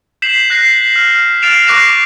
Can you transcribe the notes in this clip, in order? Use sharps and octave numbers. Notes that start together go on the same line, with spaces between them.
G6 B6 C7 E7 F#7
F#6 A#6 C7
F6
F6 A6 C7 D7 E7 F7
C#6 D6 F#6 A#6 C7 E7